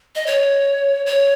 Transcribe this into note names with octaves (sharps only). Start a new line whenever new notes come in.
D#5
C#5
C#5